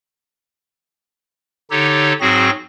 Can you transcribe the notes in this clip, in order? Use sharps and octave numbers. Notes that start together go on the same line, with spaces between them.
D3 D#4 G4 A4 C#5
G#2 F#3 C4 F#4 G#4 A#6